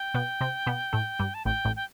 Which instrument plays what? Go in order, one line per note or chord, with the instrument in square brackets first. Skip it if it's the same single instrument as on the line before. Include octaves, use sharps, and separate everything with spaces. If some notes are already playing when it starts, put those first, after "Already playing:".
Already playing: [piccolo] G5
[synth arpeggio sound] B2 B3
C3 C4
B2 B3
A2 A3
G2 G3
[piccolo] A5
[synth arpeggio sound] A1 A2 [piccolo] G5
[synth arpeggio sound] A1 A2
[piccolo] G5